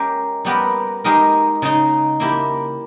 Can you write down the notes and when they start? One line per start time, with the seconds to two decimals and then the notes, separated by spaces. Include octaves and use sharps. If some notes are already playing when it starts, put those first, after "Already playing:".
Already playing: G#3 C#4 G4 A#4
0.45 G3 B3 G4 A#4
1.04 G#3 D#4 G4 A#4
1.62 C#3 G#3 D#4
2.20 A#3 E4 G4 A#4